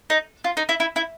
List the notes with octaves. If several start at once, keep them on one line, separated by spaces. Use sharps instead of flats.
D#4
F4
D#4
E4
E4
E4